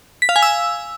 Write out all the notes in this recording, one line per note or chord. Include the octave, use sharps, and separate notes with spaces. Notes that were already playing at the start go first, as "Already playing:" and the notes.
B6
F5
G#5
E6